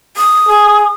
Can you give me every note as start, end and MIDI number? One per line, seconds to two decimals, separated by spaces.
0.17 0.94 87
0.49 0.88 68